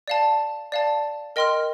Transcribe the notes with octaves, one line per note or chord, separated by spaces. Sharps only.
D5 F5 A5
D5 F5 A5
A#4 D#5 G5 C6 F6